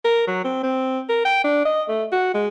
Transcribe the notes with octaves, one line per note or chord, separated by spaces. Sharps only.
A#4
F#3
C4
C4
A#4
G5
D4
D#5
A3
F#4
G#3